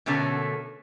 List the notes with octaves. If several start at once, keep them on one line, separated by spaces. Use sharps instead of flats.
B2 D3 A3 C#4 A4 A#4